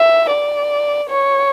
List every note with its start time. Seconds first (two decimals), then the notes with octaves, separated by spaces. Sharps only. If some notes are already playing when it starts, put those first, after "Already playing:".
Already playing: E5
0.30 D5
1.10 C#5